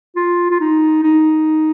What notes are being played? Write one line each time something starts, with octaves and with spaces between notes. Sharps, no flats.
F4
F4
D#4
D#4